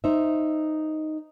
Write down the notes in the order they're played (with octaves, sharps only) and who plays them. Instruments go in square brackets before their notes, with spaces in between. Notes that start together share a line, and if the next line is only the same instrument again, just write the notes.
[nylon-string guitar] D#4 C5 E5